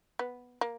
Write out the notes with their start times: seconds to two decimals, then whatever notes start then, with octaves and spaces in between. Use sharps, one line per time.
0.19 B3
0.61 A#3